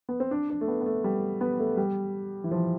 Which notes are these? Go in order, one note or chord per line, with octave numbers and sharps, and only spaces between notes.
B3
C4
D4
D4
A3
B3
B3
A3
G3
B3
A3
G3
E3
F3